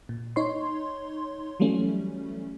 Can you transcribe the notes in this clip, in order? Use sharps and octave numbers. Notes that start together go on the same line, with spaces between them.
A#2
D#4 C#5 C6
E3 F#3 G3 A3 C#4